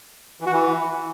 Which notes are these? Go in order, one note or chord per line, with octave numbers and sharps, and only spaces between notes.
E3
F#4
E3